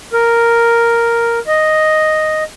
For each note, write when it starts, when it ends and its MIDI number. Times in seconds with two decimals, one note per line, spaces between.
0.13 1.39 70
1.47 2.44 75